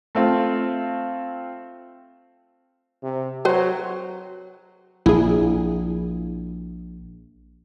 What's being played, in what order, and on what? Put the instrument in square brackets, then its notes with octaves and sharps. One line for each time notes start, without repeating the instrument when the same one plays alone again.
[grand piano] A3 C4 F4
[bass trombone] C3
[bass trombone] F#3 [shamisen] B4 C5 G5
[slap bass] A#1 [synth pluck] E4 G#4